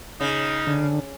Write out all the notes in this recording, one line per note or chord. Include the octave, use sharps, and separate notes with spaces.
C#3 D#4
D3